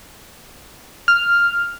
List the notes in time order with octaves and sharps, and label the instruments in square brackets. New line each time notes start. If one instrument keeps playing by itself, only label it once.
[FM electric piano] F6